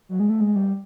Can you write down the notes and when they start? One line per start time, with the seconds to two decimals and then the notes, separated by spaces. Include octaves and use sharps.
0.09 F#3
0.20 G#3
0.30 A3
0.41 G#3
0.56 G3